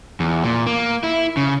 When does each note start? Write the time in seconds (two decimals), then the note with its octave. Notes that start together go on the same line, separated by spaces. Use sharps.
0.20 E2
0.44 A#2
0.67 A#3
1.03 E4
1.37 C#3